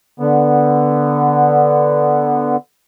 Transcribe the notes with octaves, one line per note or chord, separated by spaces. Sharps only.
D3 B3